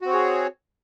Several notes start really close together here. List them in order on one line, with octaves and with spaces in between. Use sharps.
F#4 C4 C#5 G#4